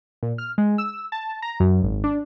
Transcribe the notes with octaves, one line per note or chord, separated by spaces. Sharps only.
A#2
F6
G#3
E6
A5
A#5
F#2
G#1
D4